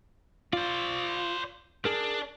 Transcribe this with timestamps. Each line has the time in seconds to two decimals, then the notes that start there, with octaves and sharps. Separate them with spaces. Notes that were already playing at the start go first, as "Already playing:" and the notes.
0.53 F4 C5 D5
1.85 D4 G#4 A#4